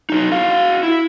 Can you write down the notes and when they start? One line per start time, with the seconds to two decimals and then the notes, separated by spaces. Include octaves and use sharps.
0.10 F#3 D#4
0.32 F#4 F5
0.83 E4